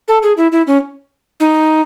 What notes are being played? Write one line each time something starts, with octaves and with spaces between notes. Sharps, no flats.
A4
G#4
E4
E4
C#4
D#4